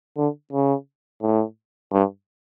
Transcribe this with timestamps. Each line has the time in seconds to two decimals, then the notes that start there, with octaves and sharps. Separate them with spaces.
0.18 D3
0.53 C#3
1.22 A2
1.93 G2